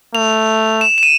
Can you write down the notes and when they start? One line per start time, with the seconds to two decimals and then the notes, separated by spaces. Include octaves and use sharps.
0.14 A3 F7
0.81 E7
0.98 E7
1.03 D#7